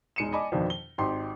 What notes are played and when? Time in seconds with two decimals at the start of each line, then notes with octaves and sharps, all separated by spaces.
0.16 E1 G#3 D#4 C#7 D#7 E7
0.32 D5 D#5 G#5 A5 B5 D6
0.52 F2 B2 D3 D#3 F3 D4
0.70 G7
0.98 G#1 C4 D#4 G4 C6